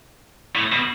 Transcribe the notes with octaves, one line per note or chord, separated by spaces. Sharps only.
A2
B2